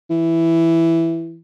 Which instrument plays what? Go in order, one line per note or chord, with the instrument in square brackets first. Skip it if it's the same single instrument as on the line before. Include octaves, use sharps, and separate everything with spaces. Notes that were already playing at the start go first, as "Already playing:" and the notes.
[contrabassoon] E3